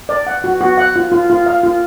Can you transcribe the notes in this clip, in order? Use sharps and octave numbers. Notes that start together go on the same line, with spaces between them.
D5
F#5
F#4
F#4
F#5
F4
F4
F4
F5
F4